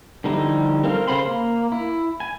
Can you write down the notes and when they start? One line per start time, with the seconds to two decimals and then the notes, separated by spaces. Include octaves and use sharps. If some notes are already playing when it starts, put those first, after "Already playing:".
0.24 D3 F3 G3 D#4 E4
0.84 C4 A4 A#4 F5 F6
1.08 C#3 C5 F5 B5 C6
1.25 A#3
1.72 E4
2.20 G#5